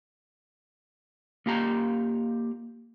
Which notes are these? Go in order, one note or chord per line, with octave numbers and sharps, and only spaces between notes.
A#3 F4 G4 A#5